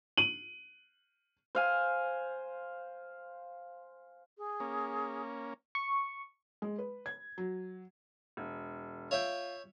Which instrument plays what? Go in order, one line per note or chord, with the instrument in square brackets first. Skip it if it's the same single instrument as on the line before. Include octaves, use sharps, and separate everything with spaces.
[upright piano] D#7 F#7
[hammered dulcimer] C5 F5 G#5
[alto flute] G#4
[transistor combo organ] A#3 C#4
[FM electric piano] C#6
[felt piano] G#3
B4
G#6
F#3
[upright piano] E1
[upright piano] F4 [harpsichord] C#5 E5 G5